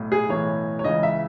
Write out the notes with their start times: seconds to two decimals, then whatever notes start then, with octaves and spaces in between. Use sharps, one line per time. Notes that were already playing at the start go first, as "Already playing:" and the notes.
Already playing: B1 A2
0.12 G#4
0.29 B1 A2 E3 C#5
0.79 C#5
0.84 C#2 C#3 E3 D#5
1.03 E5